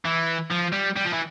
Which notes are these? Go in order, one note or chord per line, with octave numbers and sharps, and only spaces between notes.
E3
F3
G3
G3
F3
E3